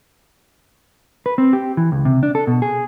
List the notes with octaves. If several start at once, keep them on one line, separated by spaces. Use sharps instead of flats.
B4
C4
G4
E3
C#2
C3
D4
A4
B2
G#4